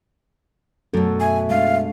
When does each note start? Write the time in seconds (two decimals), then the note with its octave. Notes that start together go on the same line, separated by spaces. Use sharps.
0.93 F#2 B2 A3 F#4 A4
1.20 E5 G#5
1.50 G#3 D4 F5